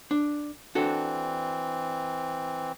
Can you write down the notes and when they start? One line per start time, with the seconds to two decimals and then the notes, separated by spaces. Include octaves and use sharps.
0.11 D4
0.75 E3 C4 D4 F#4 A4